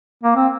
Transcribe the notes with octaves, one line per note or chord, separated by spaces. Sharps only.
A#3
C4